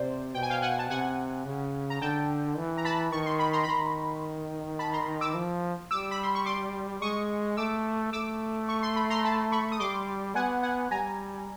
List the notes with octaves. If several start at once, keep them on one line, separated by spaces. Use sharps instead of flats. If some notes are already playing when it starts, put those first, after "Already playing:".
Already playing: C3 C5 D5
B2 G5
G#5
F5 G5
F#5 G#5
A5
C3 F#5 G#5
C#3
A#5
D3 G5 A5
E3
A#5
A5 B5
D#3 C#6
C6
B5
A#5 C6
B5
D#3 A#5 C6
A5 B5
A#5 C6
D6 E6
F3
G3 D6 E6
B5
C6
C#6
C6 D6
G#3 C#6 D#6
A3 D6 E6
A3 D6 E6
C#6
C6
B5
A#5 C6
A5 B5
B5 C#6
D#6
G3 C6 D6
B3 F#5 G#5
F#5 G#5
G3 G#5 A#5